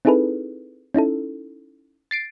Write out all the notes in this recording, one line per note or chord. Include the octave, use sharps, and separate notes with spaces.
C4 D#4 E4 G#4 A4 B4
C#4 D#4 E4 A4
A6 C7 D7